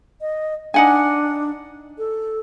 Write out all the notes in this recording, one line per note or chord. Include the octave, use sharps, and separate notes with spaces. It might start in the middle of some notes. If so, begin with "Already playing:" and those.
D#5
D4 D#4 F#5 G#5
A4